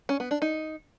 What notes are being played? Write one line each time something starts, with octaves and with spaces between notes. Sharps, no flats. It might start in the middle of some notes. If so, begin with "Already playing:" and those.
C#4
B3
D4
D#4